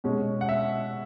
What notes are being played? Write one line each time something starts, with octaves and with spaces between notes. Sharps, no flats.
B2 G#3 C#4
F#5
E5